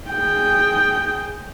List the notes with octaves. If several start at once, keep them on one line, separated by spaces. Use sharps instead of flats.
G#4 G5